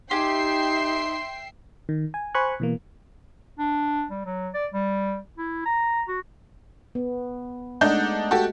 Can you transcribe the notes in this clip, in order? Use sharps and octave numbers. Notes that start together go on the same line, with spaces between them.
D#4 G4 E5 G5 G#5 C6 C7
D#3
G#5
C5 G#5 B5 C#6 F#6
B2 E3 A#3
D4
G3
F#3
D5
G3
E4
A#5
F#4
B3
G#3 A3 D4 D#4 F#5 G6
F#4 G4 A4